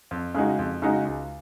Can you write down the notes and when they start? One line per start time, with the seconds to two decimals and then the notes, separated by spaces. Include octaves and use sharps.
0.11 F2
0.35 C#3 G#3 D#4 F#4
0.59 F2
0.82 C#3 G#3 D#4 F#4
1.05 C#2